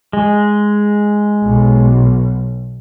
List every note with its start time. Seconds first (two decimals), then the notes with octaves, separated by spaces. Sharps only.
0.13 G#3
1.42 B1